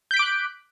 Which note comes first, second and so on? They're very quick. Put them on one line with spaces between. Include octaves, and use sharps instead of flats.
G6 B6 D7 D6 F#6